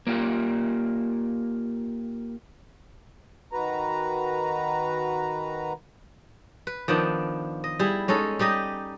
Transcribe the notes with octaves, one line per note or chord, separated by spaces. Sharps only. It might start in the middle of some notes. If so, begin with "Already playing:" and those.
A#3 F4 G4
D#3 F#4 B4 A#5
B4
D#3 F3 B3 D4
D#5
G3 E4 G#4
G#3 C#4 D#4 A4
G3 D#4 G4 D#5